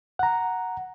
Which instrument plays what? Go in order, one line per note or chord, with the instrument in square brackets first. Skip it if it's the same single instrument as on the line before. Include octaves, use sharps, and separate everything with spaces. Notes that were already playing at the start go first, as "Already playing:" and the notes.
[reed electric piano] F#5 A#5